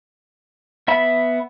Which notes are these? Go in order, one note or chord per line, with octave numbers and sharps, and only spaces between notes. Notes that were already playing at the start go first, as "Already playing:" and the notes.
B3 E5 B5